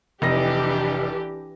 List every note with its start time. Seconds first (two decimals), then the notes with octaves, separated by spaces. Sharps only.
0.22 F1 E3 D4 G4 D#5 A#6